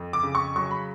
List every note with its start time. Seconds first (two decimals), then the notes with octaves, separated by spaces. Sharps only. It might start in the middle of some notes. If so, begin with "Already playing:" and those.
Already playing: F2
0.13 D6
0.23 C#3
0.35 C#6
0.56 F#3 C#6
0.71 B5